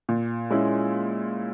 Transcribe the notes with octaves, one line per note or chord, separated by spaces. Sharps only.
A#2
G#3 C#4 E4